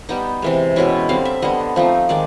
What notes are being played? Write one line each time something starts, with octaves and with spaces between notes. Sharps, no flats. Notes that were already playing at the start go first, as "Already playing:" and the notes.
G3 B3 D#4 G5
C3 E3 G#3
B2 G#3 C#4 E4
D3 G3 C4 F5
E5
D3 G3 B3 D#5
F3 A3 C4 D#4
D#3 G#3 D5